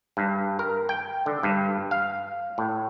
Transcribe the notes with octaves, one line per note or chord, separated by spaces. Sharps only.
G2
A#4
G5
D3
G2
F5
A2